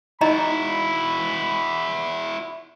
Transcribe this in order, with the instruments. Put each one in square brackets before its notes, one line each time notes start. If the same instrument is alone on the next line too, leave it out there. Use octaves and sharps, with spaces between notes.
[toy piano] D#4 D#5 A#5 [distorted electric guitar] E4 F#4 [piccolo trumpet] B5